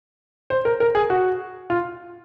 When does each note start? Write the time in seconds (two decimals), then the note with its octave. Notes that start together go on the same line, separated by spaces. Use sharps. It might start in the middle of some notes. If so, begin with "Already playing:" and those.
0.50 C5
0.65 A#4
0.80 A#4
0.95 G#4
1.10 F#4
1.70 F4